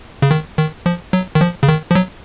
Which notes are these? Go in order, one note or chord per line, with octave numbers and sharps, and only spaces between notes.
C#3
D#3
D#3
F3
F#3
D#3
F3
C#3
D#3
F3
F#3